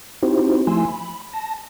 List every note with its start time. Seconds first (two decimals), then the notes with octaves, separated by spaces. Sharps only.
0.23 C4 D#4 E4 F#4 G4 C5
0.67 F3 A3 E4 G#5 C6 E6
0.88 B5
1.33 A5 A#6